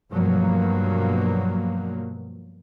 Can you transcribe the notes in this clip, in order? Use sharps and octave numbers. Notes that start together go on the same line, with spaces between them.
G2 B2 F3 F#3 A#3